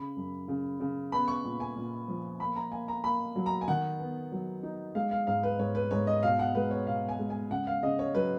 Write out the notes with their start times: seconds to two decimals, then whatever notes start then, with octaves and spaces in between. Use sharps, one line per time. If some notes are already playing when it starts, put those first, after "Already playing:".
Already playing: C#3 B5
0.17 F#2
0.48 C#3
0.80 C#3
1.12 B3 B5
1.28 C#6
1.44 A#2
1.60 G#5
1.76 A#2
2.08 F3
2.40 A#3 B5
2.56 A#5
2.72 A#3 G#5
2.88 A#5
3.04 A#3 B5
3.36 F#3
3.46 A#5
3.61 G#5
3.68 D#3 F#5
3.99 B3
4.32 F#3
4.63 D#4
4.95 G#3 F5
5.11 F5
5.27 G#2 F5
5.43 B4
5.59 G#2 C#5
5.75 B4
5.91 G#2 C#5
6.07 D#5
6.23 B2 F5
6.39 F#5
6.55 G#3 B4
6.71 C#5
6.87 B2 F5
7.09 G#5
7.19 G#3
7.30 G#5
7.51 C#3 F#5
7.67 F5
7.83 C#3 D#5
7.99 C#5
8.15 F#3 B4